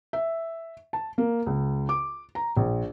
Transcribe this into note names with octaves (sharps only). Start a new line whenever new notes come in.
E5
A5
A#3
C#2
D6
A#5
A#1